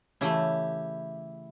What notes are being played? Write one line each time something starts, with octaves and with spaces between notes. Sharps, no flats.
C#3 E3 A3 E4 G4